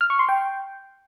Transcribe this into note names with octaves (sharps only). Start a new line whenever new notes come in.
F6
C#6
C6
G5